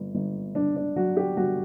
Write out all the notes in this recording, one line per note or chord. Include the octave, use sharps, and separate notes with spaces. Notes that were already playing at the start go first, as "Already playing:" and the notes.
Already playing: G1
G1
G1 D4
D4
F#3 F#4
G4
G1 F#4